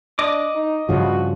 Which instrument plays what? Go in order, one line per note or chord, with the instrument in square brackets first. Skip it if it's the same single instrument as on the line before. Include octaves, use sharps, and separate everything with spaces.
[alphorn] D4 [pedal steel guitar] D#5 D6
[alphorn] D#4
[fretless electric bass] G2 C#3 F3 [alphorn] F#4